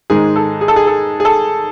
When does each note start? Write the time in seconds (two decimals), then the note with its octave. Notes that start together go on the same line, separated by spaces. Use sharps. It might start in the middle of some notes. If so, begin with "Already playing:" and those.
0.10 G#2 D#3 G#3 G#4
0.36 A4
0.61 G#4
0.68 A4
0.76 G#4
0.87 A4
1.20 G#4
1.25 A4